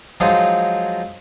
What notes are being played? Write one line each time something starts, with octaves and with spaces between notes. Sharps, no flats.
F3 F#3 G#3 D#4 F4 D#5